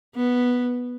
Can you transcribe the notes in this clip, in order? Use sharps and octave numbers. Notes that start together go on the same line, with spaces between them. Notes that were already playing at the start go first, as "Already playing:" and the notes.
B3